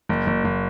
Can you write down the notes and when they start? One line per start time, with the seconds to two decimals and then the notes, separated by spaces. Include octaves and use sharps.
0.09 F#1
0.27 F#1
0.45 F#1